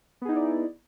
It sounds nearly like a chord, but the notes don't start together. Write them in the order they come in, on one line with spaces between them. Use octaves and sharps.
B3 G#4 D#4 E4 D5